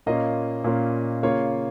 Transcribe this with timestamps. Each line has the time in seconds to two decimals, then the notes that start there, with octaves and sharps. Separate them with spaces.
0.06 A#2 A#3 C#4 F4 D#5
0.64 A#2 A#3 C#4 F4
1.23 C#3 A#3 F4 C#5